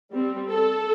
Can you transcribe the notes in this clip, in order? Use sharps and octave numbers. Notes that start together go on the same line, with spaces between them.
G3 C4
A4